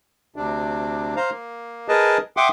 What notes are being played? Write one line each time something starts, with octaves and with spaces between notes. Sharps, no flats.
D2 C3 D4
C5 F5 A#5
A#3
G#4 A#4 B4 D#5 A5
E5 F#5 G5 C6 D6 D#6